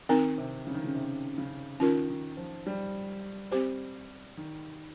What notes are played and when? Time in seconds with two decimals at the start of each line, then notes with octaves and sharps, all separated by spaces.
0.09 D#3 C4 D#4 A#4
0.38 C3
0.67 C#3
0.74 D#3
0.84 C#3
0.95 C3
1.38 C#3
1.80 D#3 C#4 F4 A#4
2.09 D#3
2.37 F3
2.67 G3
3.51 C4 G4 C5
4.37 D#3